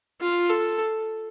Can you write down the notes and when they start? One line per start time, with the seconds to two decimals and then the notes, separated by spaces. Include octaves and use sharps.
0.21 F4
0.50 A4